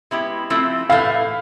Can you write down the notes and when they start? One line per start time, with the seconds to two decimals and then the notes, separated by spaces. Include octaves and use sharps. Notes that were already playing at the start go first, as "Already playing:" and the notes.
0.11 G#3 B3 E4 G4
0.50 F3 A3 C4 E4
0.89 A2 E3 A3 F5